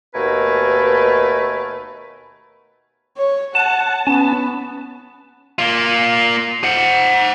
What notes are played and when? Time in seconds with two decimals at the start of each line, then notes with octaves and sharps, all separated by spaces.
0.15 D#2 B2 A3 A#4 B4 G#5
3.18 C#5
3.55 F#5 A5
4.07 B3 C#4 A5
5.58 A#3 F4
6.64 C5 F#5